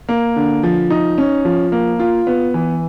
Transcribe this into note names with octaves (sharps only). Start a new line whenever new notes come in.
A#3
D3
F3
D#4
C#4
F3
A#3
F4
B3
E3